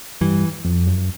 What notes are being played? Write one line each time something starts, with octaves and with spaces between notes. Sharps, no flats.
G2 E3
F2
F#2